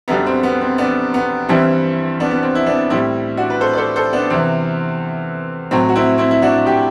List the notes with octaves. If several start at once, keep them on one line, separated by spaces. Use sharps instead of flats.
F#2 D3 G3 B3
C4
B3
C4
B3 D4
B3
G2 E3 G3 C4 E4
B3 D4
B3
C4
E4
B3 D4
A2 G3 C4 E4
D4 F#4
B4
A4 C5
D5
A4 C5
A4 C5
B3 D4
E2 C3 E3 C4
A2 F#3 C4
F#4
C4 E4
C4 E4
E4
D4 F#4
G4